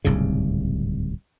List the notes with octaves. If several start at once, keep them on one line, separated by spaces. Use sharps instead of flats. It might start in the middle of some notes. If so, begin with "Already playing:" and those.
D1 C2 G#2 C#3